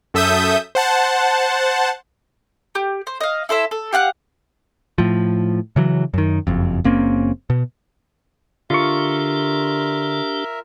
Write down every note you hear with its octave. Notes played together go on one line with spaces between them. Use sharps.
F#2 A4 E5 D#6 G6
C5 F#5 A5
G4
C5
D#5 F5
E4 A4 C5 E5
A4
G4 F5 F#5 F#6
A2 F3
C#3 E3 F#3
F#2 D#3
F#1 F2
F#1 A#3 C4 C#4
B2
D3 D4 F4 G4 A#4 E5 C#6